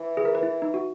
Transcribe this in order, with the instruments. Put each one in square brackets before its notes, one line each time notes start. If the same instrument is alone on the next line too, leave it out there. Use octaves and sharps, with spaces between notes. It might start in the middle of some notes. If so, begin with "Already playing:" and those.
Already playing: [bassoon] E3
[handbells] G#4
A#4
B4
E4
D#4
F#4